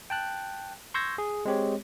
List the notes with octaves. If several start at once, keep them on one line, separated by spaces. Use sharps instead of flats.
G5 A5 F#6
C6 C#6 E6 G6 G#6 A#6
G#4
G#3 C4 G4 C#5